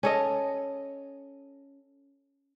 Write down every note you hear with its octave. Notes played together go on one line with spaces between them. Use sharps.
C#4 A4 D#5